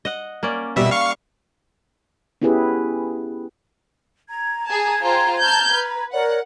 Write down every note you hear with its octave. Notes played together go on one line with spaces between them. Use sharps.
D#5 F#5
A#3 C#4 D5
B2 G3 E5
F5 C#6
B3 C#4 E4 G4 G#4 B4
A#5 G#6
G#4 A5
F4 C5 G5
A5 F6 G6
B4
A#4 C#5 D5 F#5